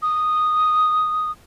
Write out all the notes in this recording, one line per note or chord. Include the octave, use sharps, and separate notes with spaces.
D#6